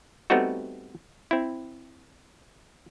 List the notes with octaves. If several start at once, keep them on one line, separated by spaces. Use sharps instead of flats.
G3 A3 B3 C4 D#4 F#4
C4 E4